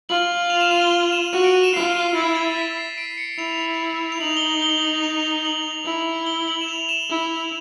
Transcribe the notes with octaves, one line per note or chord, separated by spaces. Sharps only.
F4 F#7
F7
E7
D#7
G7
F7
E7
F#4 D#7
D7
D#7
E7
F4 C7
E4 A6
A6
C7
B6
C7
D7
C#7
E4 F7
F7
D#4 F#7
G7
F#7
G7
F#7
F7
F#7
E4
G7
F#7
E7
F7
E7
E4